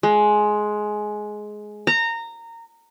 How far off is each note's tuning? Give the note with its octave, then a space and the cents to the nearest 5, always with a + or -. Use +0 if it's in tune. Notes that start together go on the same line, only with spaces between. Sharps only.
G#3 +15
A#5 -20